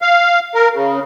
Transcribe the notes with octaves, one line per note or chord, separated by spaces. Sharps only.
F5
A#4
C#3